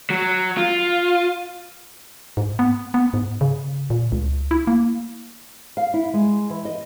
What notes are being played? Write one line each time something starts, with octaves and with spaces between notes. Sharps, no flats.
F#3
F4
G#2
B3
B3
G#2
C#3
A#2
C#2
E4
A#3
F5
E4
G#3
E3
D#5